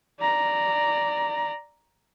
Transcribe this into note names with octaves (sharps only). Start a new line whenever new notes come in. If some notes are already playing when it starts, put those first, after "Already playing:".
D5 A#5